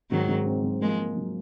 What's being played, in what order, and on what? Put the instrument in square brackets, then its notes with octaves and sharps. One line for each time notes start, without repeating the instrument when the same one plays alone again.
[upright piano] G#2 [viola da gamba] D#3 F#3
[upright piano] G#2
C4
F#3
[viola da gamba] F3 G#3 [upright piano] A#3
[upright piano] A#3
F#3